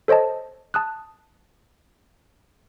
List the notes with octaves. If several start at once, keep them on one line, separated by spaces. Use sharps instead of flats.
A4 C5 C#5 D#5 A5
A5 D#6 F#6